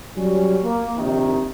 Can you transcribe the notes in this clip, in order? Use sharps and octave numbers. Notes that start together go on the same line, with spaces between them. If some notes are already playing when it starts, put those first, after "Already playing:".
F#3 G3 C#4
A#3
A#1 C3 D#3